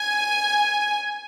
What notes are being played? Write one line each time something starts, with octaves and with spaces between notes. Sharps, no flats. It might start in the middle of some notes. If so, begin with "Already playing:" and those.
Already playing: G#5